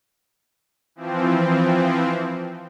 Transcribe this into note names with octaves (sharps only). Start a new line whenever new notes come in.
E3 F3 C4